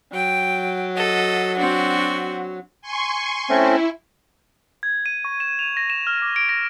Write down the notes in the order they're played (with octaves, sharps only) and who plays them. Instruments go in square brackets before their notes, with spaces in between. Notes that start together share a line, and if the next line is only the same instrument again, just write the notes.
[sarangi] F#3 [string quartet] G5
[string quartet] A4 D#5
C4 D4 F#4
[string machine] G#5 C6 C#6
[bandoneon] A3 C4 C#4 [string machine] E4
[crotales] G#6
D#7
C#6
E7
F7
A#6
E7
F6
D6
D7
A#6